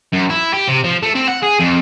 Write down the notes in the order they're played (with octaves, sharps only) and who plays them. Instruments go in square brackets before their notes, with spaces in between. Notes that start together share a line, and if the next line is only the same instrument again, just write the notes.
[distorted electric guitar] F#2
E4
G4
C3
F3
A3
C4
F#5
G#4
F2